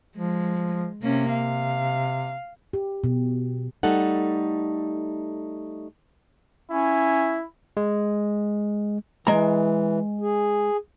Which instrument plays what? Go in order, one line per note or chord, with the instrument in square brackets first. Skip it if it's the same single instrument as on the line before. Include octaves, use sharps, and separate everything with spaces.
[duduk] F3 [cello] G#3
[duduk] C3 [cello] A#3 C#4
[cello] F5
[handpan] G4
B2
[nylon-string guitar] G3 A3 D#4 A4 F#5
[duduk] C#4 [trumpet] E4
[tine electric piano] G#3
[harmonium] E3 [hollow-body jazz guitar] G#3 A#5
[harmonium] G#4